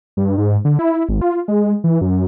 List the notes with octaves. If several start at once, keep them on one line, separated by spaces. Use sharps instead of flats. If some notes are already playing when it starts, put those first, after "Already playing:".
G2
G#2
D3
E4
G#1
F4
G#3
E3
F#2